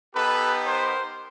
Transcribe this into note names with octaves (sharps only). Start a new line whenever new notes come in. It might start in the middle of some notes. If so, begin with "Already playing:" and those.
B3 D#4 G4 A4 B4
A#4 C5